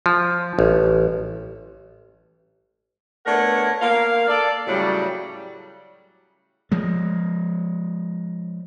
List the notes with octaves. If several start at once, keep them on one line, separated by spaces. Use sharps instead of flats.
F3
A1
A3 B3 D4 A#4 C#5 F#5
A#3 F5
A4 D5
A2 C#3 F#3 G3
F3 G#3